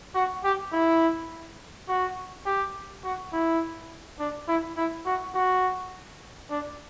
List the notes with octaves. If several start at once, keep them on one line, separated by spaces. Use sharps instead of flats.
F#4
G4
E4
F#4
G4
F#4
E4
D4
E4
E4
F#4
F#4
D4